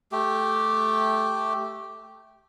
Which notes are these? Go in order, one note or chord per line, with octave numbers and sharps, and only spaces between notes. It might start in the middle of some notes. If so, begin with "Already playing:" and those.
A3 G4